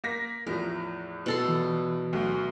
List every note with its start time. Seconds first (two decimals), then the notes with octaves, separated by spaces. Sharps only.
0.04 A#3 A#6 B6
0.47 E2 A2 F3 A#4
1.26 B2 A4 C6
1.49 E3
2.13 D2 F#3